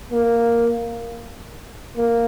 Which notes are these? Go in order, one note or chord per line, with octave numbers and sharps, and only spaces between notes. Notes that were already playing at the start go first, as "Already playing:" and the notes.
A#3
A#3